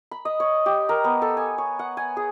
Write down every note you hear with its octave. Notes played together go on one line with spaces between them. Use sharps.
B5
D#5
C#5
G4
A#4
B3
A4
G#5
C#5
F#5
G#5
G#4